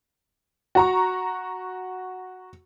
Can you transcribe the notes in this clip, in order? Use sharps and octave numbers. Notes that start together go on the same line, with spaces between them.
F#4 A#5 C#6